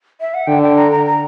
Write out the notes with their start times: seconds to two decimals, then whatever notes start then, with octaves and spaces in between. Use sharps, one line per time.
0.21 E5
0.34 F#5
0.47 D3 G5
0.62 G5
0.76 A#5
0.92 A#5
1.06 A#5